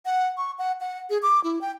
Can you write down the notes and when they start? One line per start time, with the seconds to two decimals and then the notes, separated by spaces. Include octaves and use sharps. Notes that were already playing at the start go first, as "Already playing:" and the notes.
0.06 F#5
0.37 C#6
0.59 F#5
0.81 F#5
1.10 G#4
1.22 D6
1.44 E4
1.61 G5